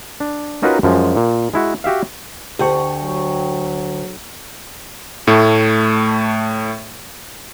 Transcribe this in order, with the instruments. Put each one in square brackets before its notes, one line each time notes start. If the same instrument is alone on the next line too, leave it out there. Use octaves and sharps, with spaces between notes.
[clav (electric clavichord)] D4
C#4 D#4 F4 F#4 A#4 B4
F#2 F3 G#3
A#2
G#3 E4 F#4
F#4 G4 E5 F5
[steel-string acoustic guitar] D2 [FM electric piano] G4 G5 C#6
[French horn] F#3
[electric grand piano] A2 A3